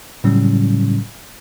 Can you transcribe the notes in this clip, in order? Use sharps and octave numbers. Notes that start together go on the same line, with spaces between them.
A2 C#3 F#3 G3 C#4